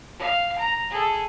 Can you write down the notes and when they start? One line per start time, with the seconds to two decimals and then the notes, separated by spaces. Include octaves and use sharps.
0.19 F5
0.58 A#5
0.90 G#4 A4